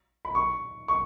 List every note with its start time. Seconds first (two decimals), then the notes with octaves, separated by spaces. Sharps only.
0.25 B5
0.35 C#6
0.88 C#6